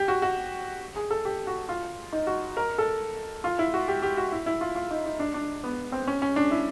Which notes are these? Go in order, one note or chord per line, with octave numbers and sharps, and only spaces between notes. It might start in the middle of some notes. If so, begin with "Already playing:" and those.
Already playing: G4
F#4
F#4
G#4
A4
G4
F#4
F4
D#4
F#4
A#4
A4
F4
E4
F#4
G4
G4
F#4
E4
E4
F4
F4
D#4
D#4
D4
D4
B3
C4
C#4
C#4
D4
E4